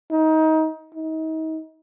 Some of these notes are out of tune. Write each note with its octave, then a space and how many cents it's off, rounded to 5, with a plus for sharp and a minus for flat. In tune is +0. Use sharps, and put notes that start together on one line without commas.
D#4 +25
D#4 +35